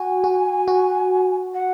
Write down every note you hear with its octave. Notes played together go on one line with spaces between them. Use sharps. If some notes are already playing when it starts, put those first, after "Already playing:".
Already playing: F#4 G#5
F#4
F#4
F#5